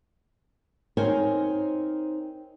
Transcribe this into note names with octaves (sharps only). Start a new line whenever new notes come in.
C4 D#4 A#4 C5 C#5 G#5